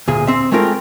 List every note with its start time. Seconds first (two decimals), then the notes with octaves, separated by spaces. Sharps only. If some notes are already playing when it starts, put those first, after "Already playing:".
0.08 D2 A#2 G#4
0.27 C4 E5
0.52 G#3 A3 C4 F4 A#4